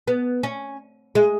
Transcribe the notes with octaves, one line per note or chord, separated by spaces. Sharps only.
B3
C#4
G#3